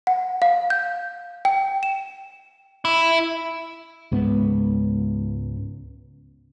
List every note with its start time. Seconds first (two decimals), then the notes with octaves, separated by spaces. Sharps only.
0.07 F#5
0.42 F5
0.70 G6
1.45 G5
1.83 E7
2.85 E4
4.12 C#2 G#2 B3